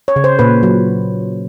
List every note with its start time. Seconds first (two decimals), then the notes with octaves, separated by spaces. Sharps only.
0.08 C#5
0.16 C#3
0.24 C5
0.39 A#2 B4
0.63 F#3